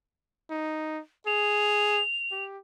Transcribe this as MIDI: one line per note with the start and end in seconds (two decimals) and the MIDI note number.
0.51 1.00 63
1.27 2.02 68
1.27 2.44 101
2.32 2.58 67